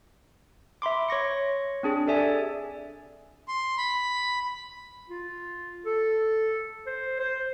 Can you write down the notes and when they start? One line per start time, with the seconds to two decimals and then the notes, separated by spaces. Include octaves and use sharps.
0.82 E5 B5 C6 D6
1.08 C#5 C#6 A#6 C#7
1.83 C4 D4 G#4
2.07 G4 A4 D5 E5 G#5
3.48 C6
3.78 B5
5.09 F4
5.85 A4
6.86 C5
7.20 C5